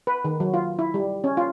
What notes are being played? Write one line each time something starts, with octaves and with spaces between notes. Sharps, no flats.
B4
D#3
F#3
F4
E4
G3
C#4
F4